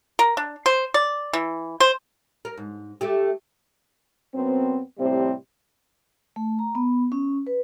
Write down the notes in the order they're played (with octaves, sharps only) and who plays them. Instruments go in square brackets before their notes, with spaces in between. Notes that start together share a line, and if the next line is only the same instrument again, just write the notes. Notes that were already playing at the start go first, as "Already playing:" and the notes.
[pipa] A#4
D4
C5
D5
E3
C5
[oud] A#4
G#2
A3 G4
[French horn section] F#2 B3 C4
A2 C3 G3 C4
[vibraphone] A3
A#5
B3
C#4
B4